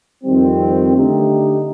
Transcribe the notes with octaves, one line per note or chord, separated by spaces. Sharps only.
F2 D#3 G3 C4
D3 A3 D#4 G4